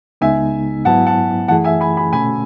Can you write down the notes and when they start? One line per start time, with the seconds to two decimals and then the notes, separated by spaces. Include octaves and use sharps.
0.21 C#2 C#3 G#3 B3 D#4 E5 G#5
0.85 G#2 F#3 B3 E4 F#5 A5
1.07 F#5 A5
1.48 F#2 E3 A3 E4 G#4 F#5 A5
1.64 E5 G#5
1.81 G#5 B5
1.97 G#5 B5
2.13 B2 A3 C#4 G#5 B5